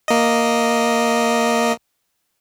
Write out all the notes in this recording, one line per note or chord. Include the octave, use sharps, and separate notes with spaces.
A#3 D#5